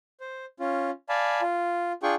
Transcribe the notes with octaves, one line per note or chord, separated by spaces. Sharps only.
C5
C#4 F4
D5 F5 G#5 A5 B5
F4
D4 F4 G#4 G5 C#6